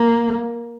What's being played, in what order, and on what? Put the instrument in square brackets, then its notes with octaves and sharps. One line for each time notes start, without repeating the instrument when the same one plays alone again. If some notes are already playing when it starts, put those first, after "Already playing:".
Already playing: [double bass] A#3